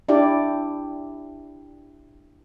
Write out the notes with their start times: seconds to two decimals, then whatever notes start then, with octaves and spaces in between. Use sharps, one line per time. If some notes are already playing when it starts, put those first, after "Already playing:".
0.08 D4 E4 G4 D5